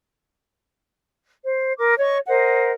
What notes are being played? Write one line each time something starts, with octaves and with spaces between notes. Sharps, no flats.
C5
A#4 D6
C#5 D#5 C#6
A#4 C5 D#5 F#5